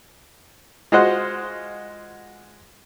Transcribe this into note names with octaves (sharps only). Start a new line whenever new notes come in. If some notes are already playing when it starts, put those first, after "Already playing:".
G#3 F4 F#4 C5 D#5 F#5